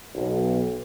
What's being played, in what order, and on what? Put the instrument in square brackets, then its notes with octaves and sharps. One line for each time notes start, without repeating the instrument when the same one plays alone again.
[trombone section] B1